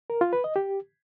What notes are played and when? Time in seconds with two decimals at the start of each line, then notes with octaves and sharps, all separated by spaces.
0.10 A#4
0.21 F4
0.33 B4
0.44 D#5
0.56 G4